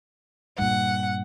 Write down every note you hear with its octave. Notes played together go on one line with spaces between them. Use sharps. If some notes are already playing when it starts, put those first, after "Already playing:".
G2 A#2 F#5